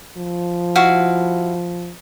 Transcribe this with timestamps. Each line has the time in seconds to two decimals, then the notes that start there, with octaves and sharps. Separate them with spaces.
0.17 F3
0.75 E4 F#4 F5